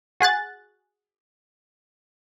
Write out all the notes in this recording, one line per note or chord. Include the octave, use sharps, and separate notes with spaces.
F#4 G#4 F#6 A6